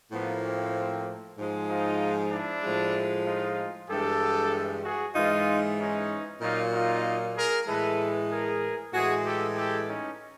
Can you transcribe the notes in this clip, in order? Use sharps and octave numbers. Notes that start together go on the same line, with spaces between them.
A2 F3 A#3 B3
C4
G#2 F3 G#3
D#4 F4
D4 E4
A2 F3 G#3
D#4 F4
G2 E3 G#3 G4 A4
F#4 G#4
G#2 E3 G#3 D#4 F4
C#4 D#4
A#2 F#3 A#3 D#4 F4
D#4 F4
G#4 A#4
A2 E3 G#3 A4 B4
G#4 A#4
A2 E3 G#3 F#4 G#4
G4 A4
G4 A4
C#4 D#4